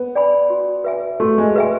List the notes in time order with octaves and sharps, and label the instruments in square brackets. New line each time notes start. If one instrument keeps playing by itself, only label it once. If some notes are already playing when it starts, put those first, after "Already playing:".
Already playing: [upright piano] B3
[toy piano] D5 G#5 B5
F#4
B4 E5 G#5
[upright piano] A3 [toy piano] F#4
[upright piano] G#3
[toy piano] B4 E5 G#5